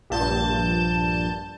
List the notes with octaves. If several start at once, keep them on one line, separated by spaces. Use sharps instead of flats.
A#1 G2 A5 G6